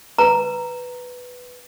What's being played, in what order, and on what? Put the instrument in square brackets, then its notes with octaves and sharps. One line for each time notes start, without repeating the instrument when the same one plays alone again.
[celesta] B4 [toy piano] A#5